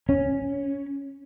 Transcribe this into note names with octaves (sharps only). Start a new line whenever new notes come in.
C#4